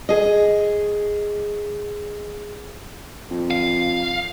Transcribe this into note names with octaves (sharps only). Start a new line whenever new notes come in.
G#4 D#5
F2
F5